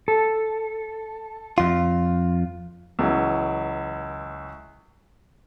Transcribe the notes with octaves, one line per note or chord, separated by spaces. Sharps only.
A4
F2 F4
C#2 E3 F#3